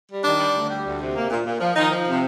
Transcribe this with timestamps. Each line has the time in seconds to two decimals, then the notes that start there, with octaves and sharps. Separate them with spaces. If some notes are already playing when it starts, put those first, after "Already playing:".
0.09 G3
0.23 D#3 D4
0.38 G3
0.54 D2
0.70 G3
0.85 D2
1.00 C3
1.15 A#3
1.30 A#2
1.45 A#2
1.60 F3
1.75 D#3 F3 D#4
1.91 F3
2.06 C3